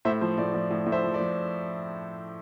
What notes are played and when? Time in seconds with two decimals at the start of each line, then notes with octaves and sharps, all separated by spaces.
0.05 A2 C5 E5
0.21 F3 C5
0.38 A2 D5
0.54 F3 D5
0.71 A2
0.86 A2
0.92 C5 E5
1.03 F3
1.14 D5
1.19 F3